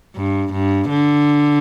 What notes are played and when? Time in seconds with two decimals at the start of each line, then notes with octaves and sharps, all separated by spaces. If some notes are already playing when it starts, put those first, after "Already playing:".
0.16 G2
0.52 G2
0.89 D3